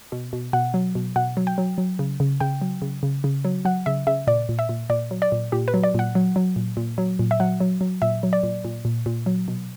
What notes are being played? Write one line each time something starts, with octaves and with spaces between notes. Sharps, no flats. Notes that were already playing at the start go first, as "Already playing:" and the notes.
B2
B2
B2 F#5
F#3
B2
B2 F#5
F#3
G5
F#3
F#3
C#3
C#3
C#3 G5
F#3
C#3
C#3
C#3
F#3
F#3 F#5
C#3 E5
C#3 E5
A#2 D5
A#2
E5
A#2
A#2 D5
F#3
D5
A#2
A#2 G4
B4
F#3
D5
A#2 F#5
F#3
F#3
A#2
A#2
F#3
A#2
E5
F#3 F#5
F#3
F#3
A#2 E5
F#3
D5
A#2
A#2
A#2
A#2
F#3
B2